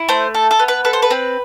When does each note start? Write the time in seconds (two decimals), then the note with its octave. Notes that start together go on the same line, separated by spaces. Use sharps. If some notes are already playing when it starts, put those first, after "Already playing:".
Already playing: E4
0.09 A3 C5
0.35 A4
0.51 A4
0.59 B3
0.68 B4
0.85 A4 B4
0.93 C5
1.02 B4
1.11 C4